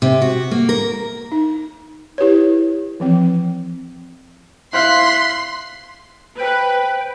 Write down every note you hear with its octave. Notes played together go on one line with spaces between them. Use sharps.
C3
F#4
A#3
A#4
D#4
E4 G4 B4 C#5
E3 F3 C4
E4 C5 F5 C6 F#6 B6
B4 C5 G5